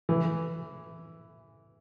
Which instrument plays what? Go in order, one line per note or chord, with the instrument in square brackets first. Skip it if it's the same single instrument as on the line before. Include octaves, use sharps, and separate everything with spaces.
[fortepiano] E3